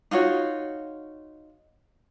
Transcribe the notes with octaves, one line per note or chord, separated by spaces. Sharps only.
D#4 F4 F#4 C#5